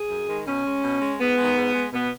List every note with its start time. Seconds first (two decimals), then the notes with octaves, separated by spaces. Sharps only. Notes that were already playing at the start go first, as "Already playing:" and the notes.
Already playing: G#4
0.10 F#2
0.29 D#3 G#3
0.47 B2 C#4
0.66 G#3
0.84 B2
1.01 G#3
1.21 G#2 B3
1.38 D#3 G#3
1.56 G#2
1.74 G#3
1.93 B2 B3